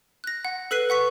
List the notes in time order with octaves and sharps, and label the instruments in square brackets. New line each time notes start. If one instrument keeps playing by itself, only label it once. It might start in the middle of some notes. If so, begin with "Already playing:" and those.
[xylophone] F#6 A#6
F#5
A4 B4 F#6 B6 C7 D#7
B4 F#5 C#6 B6